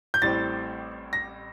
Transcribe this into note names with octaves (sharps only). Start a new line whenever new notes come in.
G6
A1 A2 G3 C4 A6
A#6